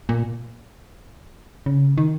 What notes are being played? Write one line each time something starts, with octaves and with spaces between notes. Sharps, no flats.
A#2
C#3
D#3